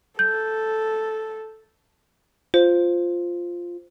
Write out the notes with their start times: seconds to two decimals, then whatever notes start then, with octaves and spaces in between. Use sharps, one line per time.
0.19 A4 G6
2.54 F4 C5